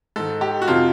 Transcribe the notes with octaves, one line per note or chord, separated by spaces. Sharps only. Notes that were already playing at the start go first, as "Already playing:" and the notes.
G#2 D#3 A4
G4
F#4
F2 C3 D#3 F4